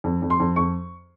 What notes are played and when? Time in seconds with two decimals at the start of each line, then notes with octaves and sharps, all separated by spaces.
0.04 F2
0.22 F2
0.30 C6
0.40 F2
0.56 F2 C#6